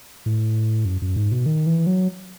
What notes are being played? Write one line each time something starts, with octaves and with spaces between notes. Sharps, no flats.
A2
F#2
F#2
G#2
B2
D#3
E3
F#3